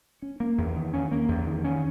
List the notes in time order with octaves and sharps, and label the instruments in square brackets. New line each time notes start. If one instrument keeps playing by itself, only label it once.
[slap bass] C#4
A#3
E2
D#3
C#4
A#3
E2
D#3
C#4